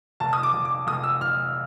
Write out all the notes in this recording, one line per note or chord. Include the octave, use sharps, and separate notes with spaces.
F1 A5
D#6
D6
F1
D6
F1 D#6
E6
F1 F6